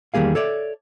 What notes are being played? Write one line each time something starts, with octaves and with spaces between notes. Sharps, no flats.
E2 D#3 G3 A#3 G#4 F5
A4 C#5 D5 E5